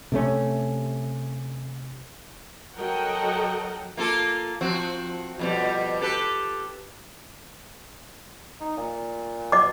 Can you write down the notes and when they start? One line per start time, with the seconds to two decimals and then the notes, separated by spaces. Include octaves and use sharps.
0.12 C3 A3 C#4
2.77 F#3 A4 A#4 D#5 F#5 G5
3.97 A#3 F4 A4
4.61 F3 C4 F#4
5.39 F2 B2 G3
6.01 G4 A4 B4
8.60 D#4
8.77 A#2
9.52 B2 D#5 D6